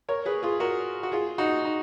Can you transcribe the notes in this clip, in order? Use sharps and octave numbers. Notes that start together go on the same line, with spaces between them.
A#4 C#5
G#4 B4
F4 G#4
F#4 A#4
F#4
F4 G#4
D#4 F#4
D#4